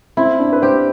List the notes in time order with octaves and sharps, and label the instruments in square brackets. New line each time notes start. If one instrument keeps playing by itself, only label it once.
[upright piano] C4 [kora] E4
[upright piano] D4
B4
[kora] G4 [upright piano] C5